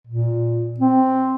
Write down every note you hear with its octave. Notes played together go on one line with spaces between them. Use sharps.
A#2
C4